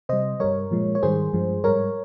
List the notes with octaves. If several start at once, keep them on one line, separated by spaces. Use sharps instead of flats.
C3 G3 C5 D#5
G2 G3 A#4 C#5
A#2 F3 G#3
C#5
G#2 D#3 G3 G#4 C5
G2 F3 G#3
G#2 G3 A#4 C#5